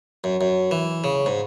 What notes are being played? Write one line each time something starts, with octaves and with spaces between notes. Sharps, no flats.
F#2
F#2
E3
C#3
G#2